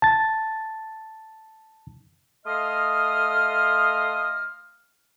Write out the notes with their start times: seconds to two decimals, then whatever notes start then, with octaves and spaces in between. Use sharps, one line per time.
0.02 A5 A6
2.46 A3 D#5 F5 C6 D#6 F6